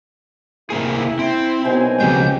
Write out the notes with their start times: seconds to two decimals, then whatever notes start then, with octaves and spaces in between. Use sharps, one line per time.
0.70 C3 A#3 E4 G#4
1.19 C4
1.66 B2 F#3 A#3 D#4 C5 G#5
2.00 C#3 F3 G#3 A#3 C4 F4 G4 G6